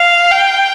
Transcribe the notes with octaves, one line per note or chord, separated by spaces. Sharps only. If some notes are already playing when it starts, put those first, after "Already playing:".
Already playing: F5
G5